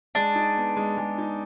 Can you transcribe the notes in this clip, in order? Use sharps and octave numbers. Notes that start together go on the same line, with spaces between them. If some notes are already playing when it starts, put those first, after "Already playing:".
G#3 D4
D#4
B3
G#3
G#3
D#4